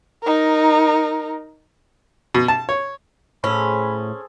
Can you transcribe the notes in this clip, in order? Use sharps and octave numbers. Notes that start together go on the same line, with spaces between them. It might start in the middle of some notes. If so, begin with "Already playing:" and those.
D#4 A#4
B2
A5
C#5
A2 C#4 G#4 A4 C5 B5